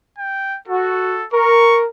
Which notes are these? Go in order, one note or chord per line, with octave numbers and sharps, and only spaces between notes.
G5
F#4 A4
A#4 C#6